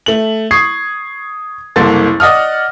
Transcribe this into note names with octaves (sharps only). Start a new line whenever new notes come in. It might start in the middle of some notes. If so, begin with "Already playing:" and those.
A3 F#7
C#6 D#6 G#6 C7
F#1 C2 A#3 A4 C6 A6
D5 D#5 F#5 D#6 F6